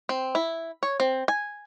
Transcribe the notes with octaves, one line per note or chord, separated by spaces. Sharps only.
C4
E4
C#5
C4
G#5